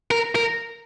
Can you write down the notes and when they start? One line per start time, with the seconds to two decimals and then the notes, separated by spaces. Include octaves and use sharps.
0.11 A#4
0.35 A#4